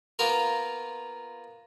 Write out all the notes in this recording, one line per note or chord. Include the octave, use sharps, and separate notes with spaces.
A#3 B3 F4 A#4